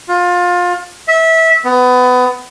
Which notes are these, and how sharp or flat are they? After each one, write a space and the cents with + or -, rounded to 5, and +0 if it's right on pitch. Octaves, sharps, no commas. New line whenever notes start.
F4 +25
E5 -20
B3 +25